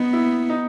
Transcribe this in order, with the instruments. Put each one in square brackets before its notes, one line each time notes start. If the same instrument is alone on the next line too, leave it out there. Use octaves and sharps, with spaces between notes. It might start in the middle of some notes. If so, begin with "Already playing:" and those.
Already playing: [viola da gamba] B3 [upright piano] D#4
[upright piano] E4
D#4